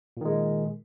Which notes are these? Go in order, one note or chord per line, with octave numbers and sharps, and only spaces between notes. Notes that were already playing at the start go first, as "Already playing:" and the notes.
A#2 D#3 G#3